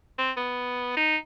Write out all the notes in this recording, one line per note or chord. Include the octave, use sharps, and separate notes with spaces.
C4
B3
D#4